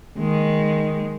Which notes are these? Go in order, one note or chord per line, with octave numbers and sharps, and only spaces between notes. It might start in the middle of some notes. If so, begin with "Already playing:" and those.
D#3 G#3